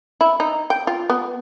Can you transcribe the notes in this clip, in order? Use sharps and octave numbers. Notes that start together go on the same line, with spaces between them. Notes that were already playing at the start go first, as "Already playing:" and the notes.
E4
D#4
G5
F4
B3